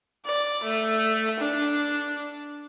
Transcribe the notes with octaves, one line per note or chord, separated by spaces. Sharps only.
D5
A3
D4